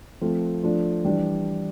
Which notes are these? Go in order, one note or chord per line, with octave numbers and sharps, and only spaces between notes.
F3 A3 C4 F4
F3 A3 D4
E3 G3 D4 G4